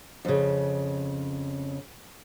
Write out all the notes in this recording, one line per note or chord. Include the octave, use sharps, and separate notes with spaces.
F2 C#3